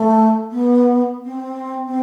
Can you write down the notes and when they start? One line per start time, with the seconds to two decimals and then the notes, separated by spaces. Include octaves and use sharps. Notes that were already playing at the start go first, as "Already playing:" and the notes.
Already playing: A3
0.51 B3
1.24 C4
1.86 C4